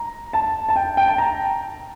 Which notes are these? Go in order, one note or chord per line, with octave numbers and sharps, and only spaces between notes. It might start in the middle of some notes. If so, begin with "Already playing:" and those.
Already playing: A#5
A5
A5
G5
G5
A5
A#5